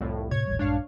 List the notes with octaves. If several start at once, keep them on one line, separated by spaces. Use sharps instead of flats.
C2 F2 A2
A2 C3 C#5 G#6
D#1 A1 G3
A#1 G2 G#3 D4 C#5 F5